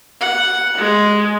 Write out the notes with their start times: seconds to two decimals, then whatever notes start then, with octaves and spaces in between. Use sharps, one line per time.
0.21 F#5
0.78 G#3